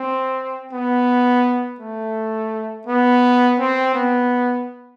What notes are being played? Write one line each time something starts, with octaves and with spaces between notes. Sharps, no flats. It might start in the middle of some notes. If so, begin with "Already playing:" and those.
Already playing: C4
B3
A3
B3
C4
B3